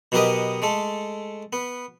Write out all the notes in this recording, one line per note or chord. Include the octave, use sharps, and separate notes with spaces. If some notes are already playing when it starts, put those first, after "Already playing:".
B2 F#3 B3 G4 A#4 D#5
G#3 A3 A4
B3